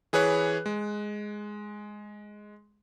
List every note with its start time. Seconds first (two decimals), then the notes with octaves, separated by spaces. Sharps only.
0.13 E3 G#4 B4 C#5 F#6
0.66 G#3